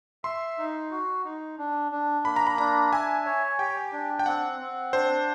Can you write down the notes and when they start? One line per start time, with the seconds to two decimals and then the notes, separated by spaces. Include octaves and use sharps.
0.24 E5 C6
0.58 D#4
0.91 F#4
1.25 D#4
1.58 D4
1.92 D4
2.25 A#3 B5
2.36 A#5
2.47 B5
2.58 D4 A#5
2.92 E5 G#5
3.26 C#5
3.59 G4 G5
3.93 D4
4.19 G5
4.26 C4 F#5
4.60 C4
4.93 D4 C5